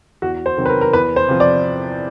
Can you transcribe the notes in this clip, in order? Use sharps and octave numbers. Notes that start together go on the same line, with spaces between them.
E2 F#4
C5
C3 D#3 F#3
B4
A#4
A#4
E2 B4
C5
C3 F3
D5